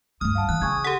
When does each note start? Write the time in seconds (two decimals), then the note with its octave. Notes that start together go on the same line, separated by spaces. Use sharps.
0.21 D2 G2 D#6 F6
0.35 F5 F#5 A5
0.49 E3 F#6
0.61 C#3 G#5 C#6 G#6
0.84 G4 A4 F#5 B6